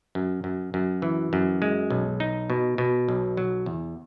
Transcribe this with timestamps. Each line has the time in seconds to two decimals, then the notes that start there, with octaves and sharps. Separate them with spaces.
0.15 F#2
0.44 F#2
0.74 F#2
1.02 E3
1.33 F#2
1.62 G#3
1.90 B1
2.20 D#4
2.50 B2
2.78 B2
3.09 B1
3.37 F#3
3.66 E2